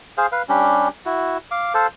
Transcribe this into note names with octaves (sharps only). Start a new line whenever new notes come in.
G#4 C5 F5
B4 F5
G3 C#4 D4 G4
E4 F#4
F5 D6
A4 C5 F5